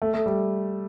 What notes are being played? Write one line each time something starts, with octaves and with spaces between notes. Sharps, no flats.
A3
A3
G3